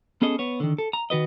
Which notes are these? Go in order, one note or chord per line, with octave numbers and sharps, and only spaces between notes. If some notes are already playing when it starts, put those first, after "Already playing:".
B3 C#4 G#4 A4 D#5
B3 C#5
D3 D#3
A4
A#5
D#3 F#4 B4 D#5